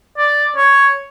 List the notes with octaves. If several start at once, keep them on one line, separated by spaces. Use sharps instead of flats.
D5
C#5